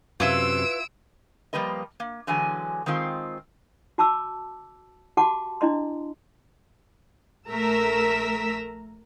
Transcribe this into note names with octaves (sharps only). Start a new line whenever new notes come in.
F#2 C3 E4 F4 B4 E6 D7
F3 G3 A#3 B4 D#5
A#3
D3 E3 F#3 G#3 G#5
D#3 G#3 C4 F4
F#4 A5 B5 D6 E6
F#4 G4 F#5 A5 C6 D6
D4 E4 D#5 C6
A#1 A3 A#4 A#5 E6 B6